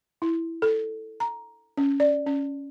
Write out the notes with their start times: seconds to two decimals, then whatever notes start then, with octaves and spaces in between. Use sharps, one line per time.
0.22 E4
0.62 A4
1.20 A#5
1.77 C#4
2.00 D5
2.26 C#4